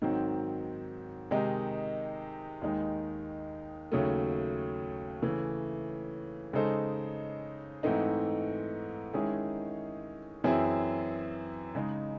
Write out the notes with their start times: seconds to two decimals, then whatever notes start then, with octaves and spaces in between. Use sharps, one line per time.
0.02 G#2 D#3 F#3 C4
1.31 C3 D#3 G#3 D#4
2.62 D#2 D#3 G#3 D#4
3.92 D#2 C#3 F#3 A3
5.22 C#3 E3 A3
6.53 C#3 G#3 D#4 A4 C5
7.83 G#2 E3 A3 C4 D#4
9.13 D#3 G#3 C#4 E4 G#4
10.44 F#2 E3 C4 E4 G#4
11.75 C#3 G#3 D#4